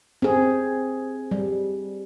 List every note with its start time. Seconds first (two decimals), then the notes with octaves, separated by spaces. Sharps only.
0.22 C4 G#4
1.31 G3